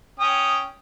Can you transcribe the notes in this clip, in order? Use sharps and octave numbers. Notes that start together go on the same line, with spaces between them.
C#4 G5 D#6